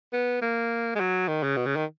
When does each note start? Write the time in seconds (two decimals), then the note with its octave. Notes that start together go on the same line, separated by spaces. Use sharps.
0.13 B3
0.42 A#3
0.95 G#3
1.00 F#3
1.28 D#3
1.43 C#3
1.56 B2
1.66 C#3
1.76 D#3